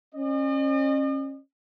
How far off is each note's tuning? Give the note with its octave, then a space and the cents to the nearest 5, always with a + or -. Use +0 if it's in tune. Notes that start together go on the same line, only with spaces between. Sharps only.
C#4 -30 D#5 -45